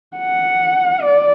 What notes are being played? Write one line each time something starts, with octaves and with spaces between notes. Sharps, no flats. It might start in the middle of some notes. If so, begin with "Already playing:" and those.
F#5
D5